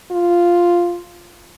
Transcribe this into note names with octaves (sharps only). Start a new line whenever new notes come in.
F4